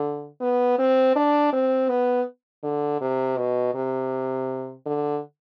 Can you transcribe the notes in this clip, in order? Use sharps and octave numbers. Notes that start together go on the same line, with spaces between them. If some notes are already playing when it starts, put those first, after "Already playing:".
Already playing: D3
B3
C4
D4
C4
B3
D3
C3
B2
C3
D3